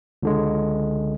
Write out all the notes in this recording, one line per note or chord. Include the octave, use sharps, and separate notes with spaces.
C#2 D3 G#3